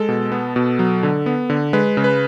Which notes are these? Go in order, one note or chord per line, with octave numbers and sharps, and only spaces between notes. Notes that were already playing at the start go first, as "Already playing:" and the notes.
Already playing: G#3 A4
B2
B3
B2
F#3
D3
B3
D3
G#3 B4
C#3
B4